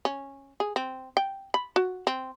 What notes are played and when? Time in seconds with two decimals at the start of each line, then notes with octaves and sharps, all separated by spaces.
0.05 C#4
0.60 G#4
0.76 C4
1.17 G5
1.54 B5
1.76 F#4
2.07 C4